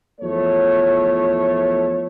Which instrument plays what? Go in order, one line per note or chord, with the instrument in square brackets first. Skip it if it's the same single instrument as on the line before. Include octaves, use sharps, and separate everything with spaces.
[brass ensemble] E2 F3 A3 C#5